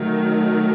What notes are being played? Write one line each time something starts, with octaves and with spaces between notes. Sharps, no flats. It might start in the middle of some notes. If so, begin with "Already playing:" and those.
Already playing: D#3 F#3 A3